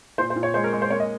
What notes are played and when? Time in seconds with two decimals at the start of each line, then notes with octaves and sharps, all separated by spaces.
0.18 A#2 C5
0.30 C5
0.36 A#2
0.43 C#5
0.54 G#3 C5
0.64 A#4
0.73 G#3
0.82 C5
0.90 A#3 C#5
1.00 D#5